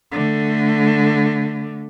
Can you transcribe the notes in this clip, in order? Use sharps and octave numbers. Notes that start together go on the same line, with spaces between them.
D3 A3